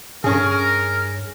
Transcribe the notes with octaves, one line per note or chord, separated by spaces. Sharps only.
G2 C#4 G#4 A#4